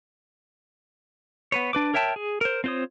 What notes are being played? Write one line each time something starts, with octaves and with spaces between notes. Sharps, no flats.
B3 B4 C#5
D4 B4 D6
A#4 C#5 E5 G5 A5
G#4
A#4 C5
C4 F4 C5 C#5 D#6